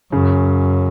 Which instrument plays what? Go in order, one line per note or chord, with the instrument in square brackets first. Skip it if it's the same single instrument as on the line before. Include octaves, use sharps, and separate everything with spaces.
[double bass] F#2 [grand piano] C#3